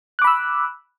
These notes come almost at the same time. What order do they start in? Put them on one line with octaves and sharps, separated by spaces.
F#6 D6 B5 E6